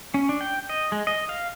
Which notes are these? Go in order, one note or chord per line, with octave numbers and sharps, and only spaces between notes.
C#4
D4
G5
D#5
G#3
D#5
F5